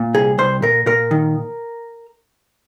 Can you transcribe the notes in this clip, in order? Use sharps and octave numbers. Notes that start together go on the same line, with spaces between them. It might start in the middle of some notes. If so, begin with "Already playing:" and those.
Already playing: A#2
C2 G#4
C2 C5
A#2 A#4
A#2 A#4
D#3